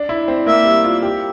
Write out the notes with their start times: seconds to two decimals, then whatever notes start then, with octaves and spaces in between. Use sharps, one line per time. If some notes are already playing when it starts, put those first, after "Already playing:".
Already playing: D4
0.09 E4
0.28 C4
0.46 A#3 E5
0.65 G3
0.84 F4
1.02 G4